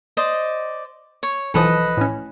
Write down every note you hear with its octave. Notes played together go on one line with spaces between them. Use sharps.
C5 D5 D#5
C#5
B1 E3 F3 A4 B4 D#5
A2 C#4